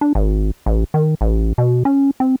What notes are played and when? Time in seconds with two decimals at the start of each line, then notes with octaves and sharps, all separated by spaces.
0.01 D4
0.15 G#1
0.66 A1
0.94 D#3
1.21 A1
1.58 B2
1.85 C#4
2.20 C4